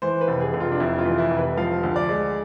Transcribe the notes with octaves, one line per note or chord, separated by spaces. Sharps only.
E3 C5
B4
F1
G#4
F1
F4
D4
F2 E4
F4
E3
E4
F1
B4
F3 F5
D2
D5
G#3